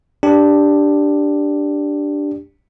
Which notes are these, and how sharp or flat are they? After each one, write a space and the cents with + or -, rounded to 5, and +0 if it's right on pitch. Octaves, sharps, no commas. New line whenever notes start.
D4 +0 G4 +5